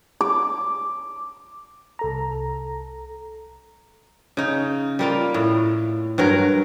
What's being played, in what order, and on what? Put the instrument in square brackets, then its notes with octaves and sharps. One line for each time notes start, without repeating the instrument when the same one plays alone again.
[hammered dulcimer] D6
[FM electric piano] C2 A4 A#5
[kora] C#3 D#4
G3 A#3 F4
A2
G2 F#3 A#4